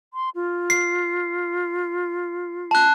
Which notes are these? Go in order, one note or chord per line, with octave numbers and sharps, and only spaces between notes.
C6
F4
C7
A5 F#6